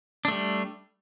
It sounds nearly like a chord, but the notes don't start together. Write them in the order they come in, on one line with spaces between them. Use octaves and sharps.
D4 A3 G3